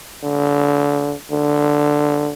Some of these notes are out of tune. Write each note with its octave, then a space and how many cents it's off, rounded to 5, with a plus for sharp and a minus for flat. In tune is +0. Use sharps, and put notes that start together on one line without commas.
D3 -30
D3 +0